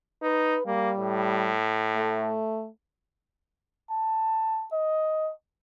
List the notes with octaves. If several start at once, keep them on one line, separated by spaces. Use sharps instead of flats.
D#4 B4
G3 A#3
A2
A3
A5
D#5